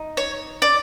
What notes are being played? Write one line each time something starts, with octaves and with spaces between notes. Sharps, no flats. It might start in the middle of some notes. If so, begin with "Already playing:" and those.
Already playing: D#4
C#5
D5